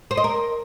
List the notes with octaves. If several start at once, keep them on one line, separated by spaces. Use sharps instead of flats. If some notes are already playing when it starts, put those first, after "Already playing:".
C5
D#5
A#4